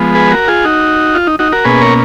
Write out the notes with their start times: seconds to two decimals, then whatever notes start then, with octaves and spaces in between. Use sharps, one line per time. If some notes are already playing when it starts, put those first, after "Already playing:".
Already playing: F3 G#3 B3
0.15 G#4 B4
0.31 F#4 A#4
0.48 F4 G#4
0.65 D#4 F#4
1.15 F4
1.27 D#4
1.39 D#4 F#4
1.52 F#4 A#4
1.65 B2 A#3 C#4 G#4 B4
1.81 A#4 C#5